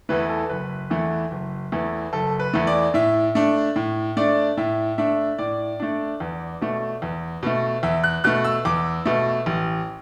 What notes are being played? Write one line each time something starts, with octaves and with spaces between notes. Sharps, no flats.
E2 E3 A3 B4
A4
F#1 B4
E2 E3 A3
F#1
E2 E3 A3
F#1 A4
B4
E2 E3 A3
D5
A2 E5
A3 D4
A2
A3 D4 D5
A2 E5
A3 D4 E5
A2 D5
A3 D4
E2
B2 A3
E2
B2 A3
E2 E5
F#6
B2 A3 F#6
E6
E2 D6
B2 A3
A1